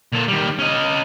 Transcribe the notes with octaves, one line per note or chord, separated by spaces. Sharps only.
A#2 A4
D#3 G3
C#4 D#5